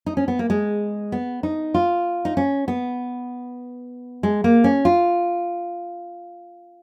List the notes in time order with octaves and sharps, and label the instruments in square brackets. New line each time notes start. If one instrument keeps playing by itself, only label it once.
[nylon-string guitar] D#4
C#4
B3
A#3
G#3
B3
D#4
F4
D#4
C#4
B3
G#3
A#3
C#4
F4